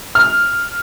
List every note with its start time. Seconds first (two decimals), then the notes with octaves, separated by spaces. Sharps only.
0.15 F6